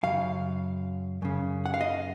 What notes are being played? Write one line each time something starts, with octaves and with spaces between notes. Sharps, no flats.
F#2 C#3 F5
F#2 C#3
F#5
F5
D#5